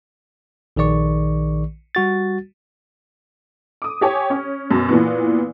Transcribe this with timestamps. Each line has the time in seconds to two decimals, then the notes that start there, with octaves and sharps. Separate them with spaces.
0.76 A#1 D#3 G#4 D5 C#6
1.95 G3 F#4 A6
3.82 D6 D#6
4.01 G4 C#5 G#5
4.30 C#4
4.71 F#2 B2
4.89 A#2 E3 B3